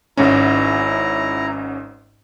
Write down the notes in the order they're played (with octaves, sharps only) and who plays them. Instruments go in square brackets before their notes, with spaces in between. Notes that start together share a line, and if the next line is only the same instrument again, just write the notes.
[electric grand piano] G#1 G#2 C#4 [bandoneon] E4 A#5